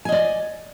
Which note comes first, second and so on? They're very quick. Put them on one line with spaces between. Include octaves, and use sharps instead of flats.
G#5 D#5 D5